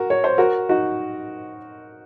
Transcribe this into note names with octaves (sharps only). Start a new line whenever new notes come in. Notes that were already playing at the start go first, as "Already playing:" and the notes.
Already playing: F#4 A#4
C#5
C5
F#4 A#4
D#4 F#4